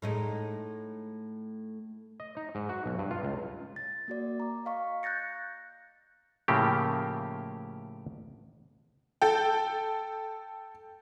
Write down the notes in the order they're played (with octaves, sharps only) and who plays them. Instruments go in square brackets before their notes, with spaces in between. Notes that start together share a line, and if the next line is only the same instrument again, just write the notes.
[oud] A2 G#3 D#4
[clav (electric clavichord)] D#5
D#4
G#2
F#4
B1
G2
F4
C#2
[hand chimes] A6
A#3 F#4 D5
A#5 D6
D#5 F5 C#6
F#6 G6 A6 A#6 C#7
[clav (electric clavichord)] A2 C#3 F3 A3 A#3 G4
[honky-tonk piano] A4 G5